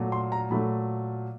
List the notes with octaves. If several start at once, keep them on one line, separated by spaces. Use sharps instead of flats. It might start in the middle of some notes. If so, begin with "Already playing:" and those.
Already playing: A#2 F#3 A3
C6
A#5
A#2 F#3 A3 B5